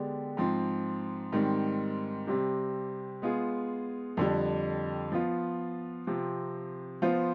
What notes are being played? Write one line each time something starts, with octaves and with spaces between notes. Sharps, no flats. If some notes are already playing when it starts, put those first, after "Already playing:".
Already playing: D3 G#3 B3 D4 G4
G#2 F3 C4
G#2 D#3 G3 C4
C3 G3 C4 G4
G#3 B3 F4 G#4
F2 D3 G3
F3 B3 F4
C3 F3 C4
F3 B3 F4 C5